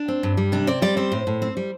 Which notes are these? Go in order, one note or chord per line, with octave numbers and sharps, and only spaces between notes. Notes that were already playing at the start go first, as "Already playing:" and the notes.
Already playing: D4
C4
G2
G3
C3 D4
C4 D5
G3 D5
C4 C5
A2
A2
C4
G3